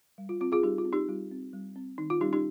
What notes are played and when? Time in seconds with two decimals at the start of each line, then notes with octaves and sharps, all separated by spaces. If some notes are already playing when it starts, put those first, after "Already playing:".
0.18 G3
0.29 F4
0.41 C4 F4
0.52 F4 G#4
0.63 G3 D#4 G4
0.78 F4
0.85 C4
0.93 D#4 G4
1.08 G3 F4
1.31 C4
1.53 G3
1.76 C4
1.98 D#3 D#4
2.10 F4
2.21 G3 D#4 G4
2.24 C#4
2.33 D#4 G4